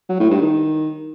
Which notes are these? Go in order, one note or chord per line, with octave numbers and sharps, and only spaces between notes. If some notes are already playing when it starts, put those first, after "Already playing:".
F#3
A2
G2
D#3